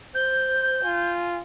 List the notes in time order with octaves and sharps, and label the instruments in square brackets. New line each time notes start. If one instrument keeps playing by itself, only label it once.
[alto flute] C5 [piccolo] G6
[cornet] F4 [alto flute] G#5